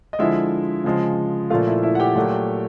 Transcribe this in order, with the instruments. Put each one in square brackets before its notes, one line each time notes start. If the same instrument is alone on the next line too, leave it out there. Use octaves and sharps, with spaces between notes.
[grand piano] D#5
D3 F3 G#3 E4 E5
C#3 F3 G#3
A#2 F3 A3 F4 F5
E4 E5
E4 E5
F#5
G4 G5
A#2 F#3 A3